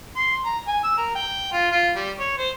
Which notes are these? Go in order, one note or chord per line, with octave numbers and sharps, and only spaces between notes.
C6
A#5
G#5
E6
A#4
G5
F4
F4
G3
C#5
C5